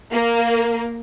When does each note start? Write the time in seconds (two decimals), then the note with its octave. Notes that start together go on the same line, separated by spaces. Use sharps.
0.12 A#3